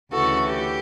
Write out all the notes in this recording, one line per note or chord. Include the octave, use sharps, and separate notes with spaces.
D2 C#3 E3 F#4 A4
G4